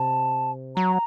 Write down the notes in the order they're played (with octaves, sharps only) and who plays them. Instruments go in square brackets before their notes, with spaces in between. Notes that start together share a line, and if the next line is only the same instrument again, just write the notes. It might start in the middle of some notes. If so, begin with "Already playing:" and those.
Already playing: [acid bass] C3 [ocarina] A5
[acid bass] F#3 [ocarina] A#5